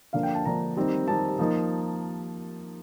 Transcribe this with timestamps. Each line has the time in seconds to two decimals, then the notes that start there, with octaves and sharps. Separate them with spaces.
0.13 D3 F3 A#3 D4 F5
0.23 G5
0.34 A5
0.45 D3 F3 A#3 D4 A#5
0.76 D#3 G3 C4 D#4
1.08 D#3 G3 C4 D#4 A5
1.39 F3 A#3 D#4